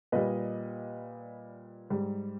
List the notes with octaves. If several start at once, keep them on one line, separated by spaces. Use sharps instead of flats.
A#2 G3 B4 D#5
G#2 G3